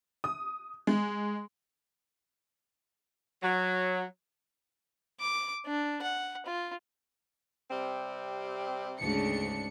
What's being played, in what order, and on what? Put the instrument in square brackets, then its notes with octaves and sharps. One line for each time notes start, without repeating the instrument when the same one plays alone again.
[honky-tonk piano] D#6
G#3
[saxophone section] F#3
[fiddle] D6
D4
F#5
F4
[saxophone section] C3 G3 C4
[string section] D2 D4 C#7 [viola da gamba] G#2 C#3